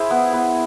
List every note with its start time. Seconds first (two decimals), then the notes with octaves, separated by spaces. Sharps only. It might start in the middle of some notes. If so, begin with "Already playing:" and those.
Already playing: E4 G#4 C5
0.11 B3
0.33 B3